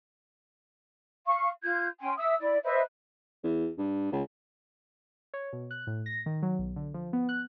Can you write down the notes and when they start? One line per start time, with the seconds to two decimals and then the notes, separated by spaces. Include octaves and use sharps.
1.26 F5 C#6
1.63 F4 G6 G#6
2.00 C#4 G5 G#5 C6
2.17 E5 D#6 E6
2.39 E4 D5
2.63 B4 C5 D#5 E5
3.44 E2
3.78 G2
4.13 C#2
5.34 C#5
5.53 B2
5.71 F#6
5.87 A2
6.06 A#6
6.26 D#3
6.42 F#3
6.59 B1
6.76 D3
6.94 F3
7.13 B3
7.29 F#6